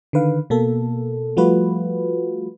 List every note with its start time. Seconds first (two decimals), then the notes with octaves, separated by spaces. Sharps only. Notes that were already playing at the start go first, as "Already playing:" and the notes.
0.13 D3 D#3 B4 F5
0.50 B2 A#3 A4
1.37 F3 G3 A3 F4 F#4 B4